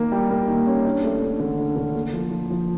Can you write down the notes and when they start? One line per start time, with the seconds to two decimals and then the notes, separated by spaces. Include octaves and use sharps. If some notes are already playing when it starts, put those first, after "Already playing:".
Already playing: D#3 A#3
0.12 G3
0.30 A#3
0.48 D#3
0.67 C#4
0.85 D4
1.03 A3
1.22 D4
1.40 D3
1.59 D4
1.76 D3
1.95 A#3
2.13 F3
2.31 F3
2.50 F3